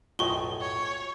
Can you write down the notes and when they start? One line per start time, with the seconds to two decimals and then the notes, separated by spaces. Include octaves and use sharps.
0.19 B1 F#2 A2 F4 G4 D#5 C#6 G7
0.61 C#5